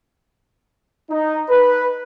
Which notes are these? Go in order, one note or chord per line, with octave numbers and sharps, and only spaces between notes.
D#4
B4